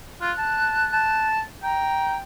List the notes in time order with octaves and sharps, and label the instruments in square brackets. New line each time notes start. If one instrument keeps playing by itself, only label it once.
[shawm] F4 [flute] F#6
[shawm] A5
A5
[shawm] G5 [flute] A#5